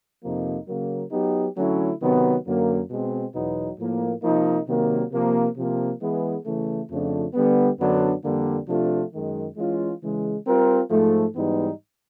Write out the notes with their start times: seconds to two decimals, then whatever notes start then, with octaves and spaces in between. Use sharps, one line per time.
0.23 F2 C3 F3 A#3 D#4
0.68 C#3 F#3 A#3
1.11 F#3 B3 D#4 G4
1.57 D3 F#3 A3 C#4 E4
2.00 C3 D#3 F#3 B3
2.45 F#2 D3 F#3 A#3
2.89 B2 G#3 C4
3.34 E2 B2 F#3 B3 D#4
3.79 A2 F3 A#3
4.23 C3 F3 A#3 D#4
4.67 C3 D#3 F#3 A#3
5.12 C3 F3 A#3
5.56 C3 F3 A#3
6.00 E3 G#3 B3 E4 G#4
6.45 C#3 E3 A3
6.90 F2 C#3 F3 A3 D4
7.34 D3 G3 B3
7.79 F#2 D3 F#3 B3 D4
8.23 F2 D3 G3 A#3
8.68 C3 F3 A3 D4 F4
9.13 F#2 D#3 G#3
9.57 E3 G#3 C#4 F4
10.01 C#3 E3 G#3
10.46 G3 C4 F4 A#4
10.90 G#2 F3 A3
11.35 G#2 E3 G3 B3 D#4